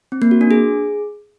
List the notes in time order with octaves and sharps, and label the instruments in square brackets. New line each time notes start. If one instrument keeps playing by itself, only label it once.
[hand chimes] C4
A#3
F#4
D4
G#4